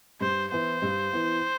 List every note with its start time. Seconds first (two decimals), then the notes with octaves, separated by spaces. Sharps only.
0.21 G2 C5
0.51 E3 B3 E4 C5
0.82 G2
1.13 E3 B3 E4